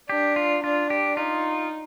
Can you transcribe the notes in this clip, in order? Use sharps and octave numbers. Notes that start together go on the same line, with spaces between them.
D4 G4
F4
D4 F4
G4
D#4 F4